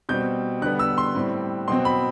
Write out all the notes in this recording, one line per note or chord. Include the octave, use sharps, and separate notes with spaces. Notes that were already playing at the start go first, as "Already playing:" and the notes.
B2 G3 C4 G6
D3 G3 B3 F#6
E6
C6
A2 G3 C4
B2 F#3 C4 C6
B5